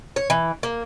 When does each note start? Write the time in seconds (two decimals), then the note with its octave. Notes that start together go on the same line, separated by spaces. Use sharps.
0.16 C#5
0.30 E3
0.63 A#3